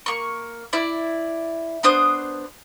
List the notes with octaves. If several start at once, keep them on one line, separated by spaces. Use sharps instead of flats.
A#3 C#6
E4 D5
B3 D4 C5 D#6